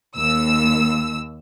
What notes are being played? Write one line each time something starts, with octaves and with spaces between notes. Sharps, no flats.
D#2 E6